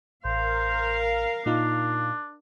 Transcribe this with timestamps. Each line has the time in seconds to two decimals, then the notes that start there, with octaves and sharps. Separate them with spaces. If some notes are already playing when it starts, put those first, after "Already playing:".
0.25 A1 A#4 C5 F5
1.46 A#2 D4 D#4 F4